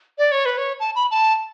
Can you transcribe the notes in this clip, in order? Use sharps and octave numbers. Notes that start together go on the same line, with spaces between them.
D5
C#5
B4
C#5
A5
B5
A5